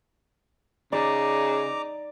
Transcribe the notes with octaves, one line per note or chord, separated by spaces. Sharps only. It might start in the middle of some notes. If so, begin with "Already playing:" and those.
C#3 D#4 D5 A#5 D6